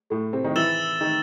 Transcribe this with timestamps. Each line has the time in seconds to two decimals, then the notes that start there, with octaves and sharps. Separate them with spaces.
0.10 A2 A3
0.33 C3 C4
0.44 D#3 D#4
0.56 E3 E4 E6 A6 E7 G7
1.01 D#3 D#4